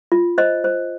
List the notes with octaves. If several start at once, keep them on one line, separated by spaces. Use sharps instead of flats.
F4
C5 D#5
C5